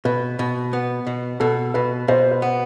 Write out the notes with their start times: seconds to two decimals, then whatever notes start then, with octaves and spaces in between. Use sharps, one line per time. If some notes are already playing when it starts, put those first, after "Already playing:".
0.05 B2 B4
0.39 B2
0.73 B3
1.07 B2
1.40 B2 A4
1.74 B2 B4
2.08 B2 C5
2.31 B4
2.42 B3